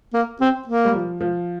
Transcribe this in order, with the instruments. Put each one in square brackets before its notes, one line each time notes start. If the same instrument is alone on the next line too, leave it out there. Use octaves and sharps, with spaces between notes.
[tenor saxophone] A#3
C4
A#3
[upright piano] G3
F3
F3